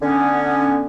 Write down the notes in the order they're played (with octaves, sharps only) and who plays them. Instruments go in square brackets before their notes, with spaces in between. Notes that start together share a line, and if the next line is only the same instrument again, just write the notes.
[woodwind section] D3 B3 C#4